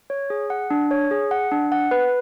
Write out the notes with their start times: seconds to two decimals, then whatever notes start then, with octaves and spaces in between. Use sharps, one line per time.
0.10 C#5
0.30 G#4
0.50 F#5
0.70 D4
0.91 C#5
1.11 G#4
1.31 F#5
1.51 D4
1.72 F#5
1.91 B4